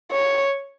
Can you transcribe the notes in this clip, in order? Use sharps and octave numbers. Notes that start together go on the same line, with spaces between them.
C#5